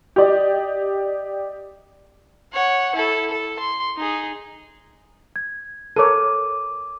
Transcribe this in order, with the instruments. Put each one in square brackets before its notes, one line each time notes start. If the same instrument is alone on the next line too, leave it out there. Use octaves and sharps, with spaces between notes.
[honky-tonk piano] G4 D5 D#5
[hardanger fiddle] C#5 F#5
E4 A4
A4
C6
D#4 G#4
[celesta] G#6
[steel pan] A4 A#4 C#5 [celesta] D6 D#7